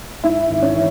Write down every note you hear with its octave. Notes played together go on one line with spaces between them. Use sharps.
G#2 E4
G#1
C#4
E3